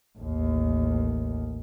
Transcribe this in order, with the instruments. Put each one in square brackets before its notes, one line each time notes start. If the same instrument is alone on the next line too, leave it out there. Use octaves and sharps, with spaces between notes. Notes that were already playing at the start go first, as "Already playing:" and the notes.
[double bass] A1 D#2